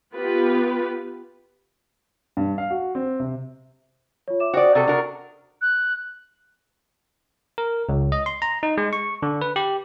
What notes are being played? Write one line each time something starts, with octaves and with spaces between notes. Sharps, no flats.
B3 F4 G4 B4
G2
F5
F#4
C4
C3
F4 C#5
E5 D6 E7
F#4 C5 D5 G5
C3 F#4 A4 A6
D4 F#4 A#4
F#6
A#4
C#2
D#5
C6
A#5
D#4
G#3
C#6
D3
B4
G4